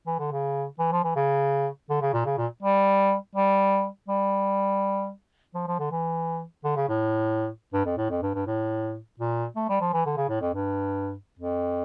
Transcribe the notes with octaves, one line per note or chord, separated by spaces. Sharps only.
E3
D3
C#3
E3
F3
E3
C#3
D3
C#3
A#2
C#3
A#2
G3
G3
G3
F3
F3
D3
E3
D3
C#3
A2
G2
F2
A2
F2
G2
G2
A2
A#2
A3
G3
F3
E3
D3
C#3
A2
F2
G2
F2